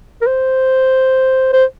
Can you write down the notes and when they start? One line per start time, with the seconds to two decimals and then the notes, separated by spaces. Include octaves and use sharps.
0.22 A#4
0.27 C5
1.53 C5